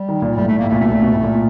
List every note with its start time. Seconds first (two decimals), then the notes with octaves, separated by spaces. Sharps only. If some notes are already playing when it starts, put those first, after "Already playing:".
Already playing: G3
0.09 D#3
0.22 A#2
0.37 A2 G3
0.48 A3
0.59 A2 A#3
0.70 A3
0.72 A#2
0.80 B2 A3
0.91 A#2
1.02 B2
1.14 A2
1.24 A#2